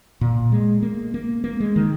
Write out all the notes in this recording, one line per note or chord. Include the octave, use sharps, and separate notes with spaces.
A#2
G#3
A#3
A#3
A#3
G#3
D#3